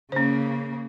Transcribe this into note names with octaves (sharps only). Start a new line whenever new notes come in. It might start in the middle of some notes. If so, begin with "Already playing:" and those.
C#3 A#3 C#4 C5